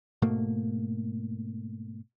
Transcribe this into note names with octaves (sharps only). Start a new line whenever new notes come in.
G#2 B2 A3 A#3